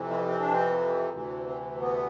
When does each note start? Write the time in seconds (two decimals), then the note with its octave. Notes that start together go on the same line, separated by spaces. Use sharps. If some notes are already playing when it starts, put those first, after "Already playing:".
Already playing: F2 C3 E3
0.10 C4
0.28 C4
0.40 D4
0.53 C4
1.13 D2 C3 E3
1.47 C4
1.81 B3